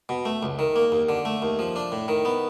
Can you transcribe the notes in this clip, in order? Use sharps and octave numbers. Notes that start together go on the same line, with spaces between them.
B2
A3
C#2
D#3
A#3
D#2
D3
A3
D#2
F3
D4
A2
D#3
B3